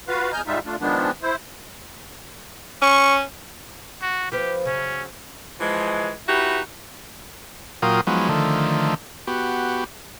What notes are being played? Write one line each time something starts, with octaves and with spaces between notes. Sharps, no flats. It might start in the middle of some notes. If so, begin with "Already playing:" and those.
F4 F#4 B4 F5
E2 D#5 G#5 A#5 F6 G6
G#2 G3 G#3 D#4 F4 E5
A3 D4 F4
D#3 F3 G#3 B3 D4
E4 C5
C#4 C#6
F#4
F3 B3 G4
C#3 F#3 C#4
E3 F3 G#3
D#4 E4 F#4 G4 B4
A#2 F#3 F4 A#4 G5 D#6
F3 F#3 G#3 B3 D#4
D3 D#3 F3 A3
B3 F#4 G4